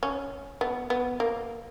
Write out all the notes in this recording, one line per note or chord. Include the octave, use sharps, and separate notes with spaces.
C#4
B3
B3
A#3